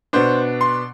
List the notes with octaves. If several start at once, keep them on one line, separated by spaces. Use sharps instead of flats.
B2 B3 D4 C5
C6